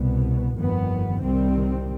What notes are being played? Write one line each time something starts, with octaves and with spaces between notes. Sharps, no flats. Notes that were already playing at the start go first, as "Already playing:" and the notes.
Already playing: C2 B2 B3
G1 F2 D#3 B3
C2 C3 D#3 G3 C4